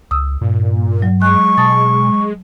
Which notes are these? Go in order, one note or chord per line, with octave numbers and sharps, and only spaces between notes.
C#2 D#6 E6
G2 A#2
F#3
G#3 C#6 F#6
B2 A5 D#6 A6